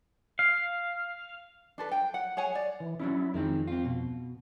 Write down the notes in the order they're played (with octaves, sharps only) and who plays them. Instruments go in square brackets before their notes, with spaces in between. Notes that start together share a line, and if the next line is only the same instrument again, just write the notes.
[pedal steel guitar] F5
[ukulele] D4 A4 B4
G5
F#5
G#4 C#5 F#5 G#5
D5
[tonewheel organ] E3
[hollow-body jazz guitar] F#3 C#4 D4 [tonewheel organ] E4
[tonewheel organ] F2 [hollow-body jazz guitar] D#3 G#3 C4
[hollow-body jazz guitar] C4 F4
B2